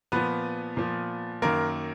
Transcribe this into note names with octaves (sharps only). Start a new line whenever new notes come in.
A#2 F3 B3 B4
A#2 F3
F#2 D#3 A#3 A#4